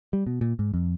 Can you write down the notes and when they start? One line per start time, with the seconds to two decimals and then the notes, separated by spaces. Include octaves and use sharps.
0.13 G3
0.27 B2
0.41 A#2
0.59 G#2
0.74 F2